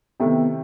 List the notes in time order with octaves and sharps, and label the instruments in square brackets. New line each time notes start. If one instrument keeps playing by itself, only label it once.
[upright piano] C3 D#3 A3 E4 [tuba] B3